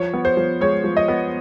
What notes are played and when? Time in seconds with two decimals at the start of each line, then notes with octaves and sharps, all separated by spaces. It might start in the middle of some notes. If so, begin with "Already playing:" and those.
Already playing: F3 C#5
0.14 B3
0.25 C5
0.37 F3
0.61 G#3 C#5
0.84 F3
0.97 D#5
1.08 B3